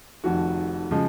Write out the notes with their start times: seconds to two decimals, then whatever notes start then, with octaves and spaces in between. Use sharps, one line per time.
0.24 F1 F2 D#3 F#4
0.91 C#3 F3 G#3